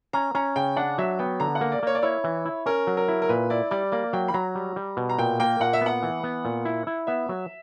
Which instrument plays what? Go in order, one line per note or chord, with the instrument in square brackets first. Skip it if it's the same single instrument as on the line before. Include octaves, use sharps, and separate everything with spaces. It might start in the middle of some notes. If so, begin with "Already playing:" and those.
[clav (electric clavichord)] C#4 [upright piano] A#5
[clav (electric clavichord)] C#4 [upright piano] A#5
[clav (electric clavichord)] C#3 [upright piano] G5
[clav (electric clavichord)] D4 [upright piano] F#5
[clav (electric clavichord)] F#3 [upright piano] E5
[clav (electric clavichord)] B3 [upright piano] G5
[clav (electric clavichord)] D3 [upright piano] A#5
[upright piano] F#5
[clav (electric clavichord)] A#3
[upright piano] D5
[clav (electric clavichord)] A#3 [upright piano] C#5
[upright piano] D5
[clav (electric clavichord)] E4 [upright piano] C#5
[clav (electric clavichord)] E3
E4
[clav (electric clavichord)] C#4 [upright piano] A#4
[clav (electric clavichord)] F#3
[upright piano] A#4
[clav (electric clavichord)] E4
[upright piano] A#4
[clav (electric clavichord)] A#2 [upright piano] B4
[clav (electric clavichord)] E4 [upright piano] D5
[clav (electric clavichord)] G3 [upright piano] D5
[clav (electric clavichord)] A#3 [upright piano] D5
[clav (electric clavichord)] F#3 [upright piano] G5
[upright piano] B5
[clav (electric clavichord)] F#3 [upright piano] A#5
[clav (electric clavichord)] G3
G3
B2
[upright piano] A#5
[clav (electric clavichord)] A#2 [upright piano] G5
[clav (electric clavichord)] A#3 [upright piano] G5
[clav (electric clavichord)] A#2 [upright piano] F#5
[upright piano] E5
[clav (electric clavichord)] B3 [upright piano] F#5
[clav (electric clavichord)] E3
B3
A#2
E4
E4
[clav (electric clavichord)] B3 [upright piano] E5
[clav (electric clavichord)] F#3